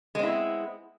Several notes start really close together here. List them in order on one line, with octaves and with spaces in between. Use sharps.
G#3 C4 E4 B3